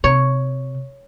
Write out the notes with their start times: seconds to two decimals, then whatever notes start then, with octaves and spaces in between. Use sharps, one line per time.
0.04 C3 C#5